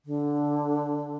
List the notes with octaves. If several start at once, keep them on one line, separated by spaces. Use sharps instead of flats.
D3